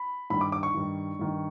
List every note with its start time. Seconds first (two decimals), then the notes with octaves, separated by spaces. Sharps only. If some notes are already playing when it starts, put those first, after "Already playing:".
Already playing: B5
0.30 G2 D#3 B5
0.41 D6
0.52 D6
0.63 C#6
0.74 G2 D#3
1.19 G2 D#3